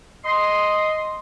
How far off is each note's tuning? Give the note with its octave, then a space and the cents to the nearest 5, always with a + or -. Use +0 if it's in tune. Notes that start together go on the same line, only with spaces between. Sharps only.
D#5 +0 C6 +0